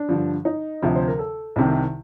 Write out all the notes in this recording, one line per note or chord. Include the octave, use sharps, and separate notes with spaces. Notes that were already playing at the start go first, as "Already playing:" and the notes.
Already playing: D4
G2 D3 F3
D#4
D2 C3 F3
C5
A#4
A4
C2 C3 D#3